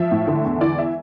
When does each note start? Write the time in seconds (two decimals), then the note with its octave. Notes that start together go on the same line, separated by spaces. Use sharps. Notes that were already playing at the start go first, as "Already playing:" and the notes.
Already playing: F3 E5
0.11 A2
0.27 D3
0.44 E2
0.61 E3 D5
0.78 E5